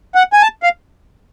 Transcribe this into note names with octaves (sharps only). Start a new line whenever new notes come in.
F#5
G#5
A5
F5